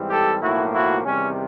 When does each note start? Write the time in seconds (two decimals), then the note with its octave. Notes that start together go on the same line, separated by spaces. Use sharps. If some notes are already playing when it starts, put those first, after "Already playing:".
Already playing: G#2 E3 G3 C4
0.09 G4 A4
0.41 B1 A2 F3 A#3 E4 F#4
0.74 E4 F#4
1.05 E2 C3 D#3 G3 C#4